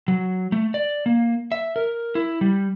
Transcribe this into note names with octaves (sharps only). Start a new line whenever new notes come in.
F#3
A3
D5
A#3
E5
A#4
E4
G3